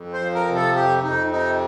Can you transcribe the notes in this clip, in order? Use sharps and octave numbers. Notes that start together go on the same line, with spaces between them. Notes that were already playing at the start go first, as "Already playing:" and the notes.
Already playing: F2
C5
F3
A#4
C3
A4
F2 G4
F2 D#4
C3 D#4